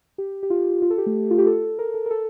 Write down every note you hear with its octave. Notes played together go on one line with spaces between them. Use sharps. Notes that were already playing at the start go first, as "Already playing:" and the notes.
G4
G4
F4
F4
A4
G4
A3
F4
G4
A4
A#4
A4
A#4
A4